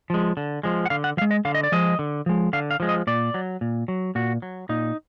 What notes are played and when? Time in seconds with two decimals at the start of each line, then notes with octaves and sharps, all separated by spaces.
0.10 F3 G#3
0.37 D3
0.63 F3 G#3
0.86 F#5
0.90 D3 F5
1.04 F#5
1.17 F3 F5
1.21 G#3
1.31 D#5
1.45 D3 F5
1.55 D#5
1.63 D5
1.72 F3 G#3 D#5
1.99 D3
2.26 F3 G#3
2.53 D3 F5
2.71 F5
2.80 F3 G#3
2.89 D#5
3.07 A#2 D5
3.34 F#3
3.61 A#2
3.88 F#3
4.15 A#2 F#4
4.42 F#3
4.69 A#2 D#4